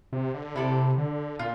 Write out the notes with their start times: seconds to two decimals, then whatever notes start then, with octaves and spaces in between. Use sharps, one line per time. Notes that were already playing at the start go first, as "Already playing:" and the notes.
0.13 C3
0.34 D3
0.55 C3 E4 A4 D5
0.98 D3
1.39 A#2 F4